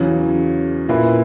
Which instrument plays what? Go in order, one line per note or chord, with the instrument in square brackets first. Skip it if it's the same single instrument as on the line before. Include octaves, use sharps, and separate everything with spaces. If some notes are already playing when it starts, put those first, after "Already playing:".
Already playing: [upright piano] E2 C#3 F#3
A#2 A#3 E4 B4